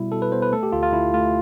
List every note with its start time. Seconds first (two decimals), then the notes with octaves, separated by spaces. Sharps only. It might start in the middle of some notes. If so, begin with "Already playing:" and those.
Already playing: B2 G3 E4
0.12 B2 A4
0.22 B4
0.32 B3 C5
0.42 B4
0.52 A3 A4
0.63 G4
0.72 D2 F4
0.83 F4
0.92 D2 E4
1.14 A3 F4